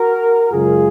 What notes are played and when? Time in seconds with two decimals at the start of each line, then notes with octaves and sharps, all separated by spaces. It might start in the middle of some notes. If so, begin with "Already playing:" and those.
Already playing: F#4 A#4
0.52 F#2 C#3 G#3 F4 G#4